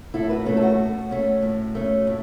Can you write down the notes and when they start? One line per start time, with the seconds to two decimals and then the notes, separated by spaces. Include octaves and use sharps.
0.14 A2 E4 A4
0.30 F#4 B4
0.46 A3 C#4 E4 A4
0.57 A4
0.62 F#4
0.78 A2
1.11 A3 C#4
1.42 A2
1.75 A3 C#4
2.07 A2